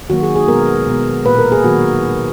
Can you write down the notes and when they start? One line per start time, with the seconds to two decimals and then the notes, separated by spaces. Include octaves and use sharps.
0.10 D#3 F#3 A#3 F#4
0.23 G#4
0.36 G#4
0.48 B2 G#3 B3 A#4
0.87 B2 G#3 B3
1.26 A#2 A#3 B4
1.39 A#4
1.52 G#4
1.64 D#3 F#3 B3 F#4